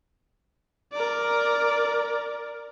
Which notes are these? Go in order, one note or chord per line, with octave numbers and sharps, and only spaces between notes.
A#4 D5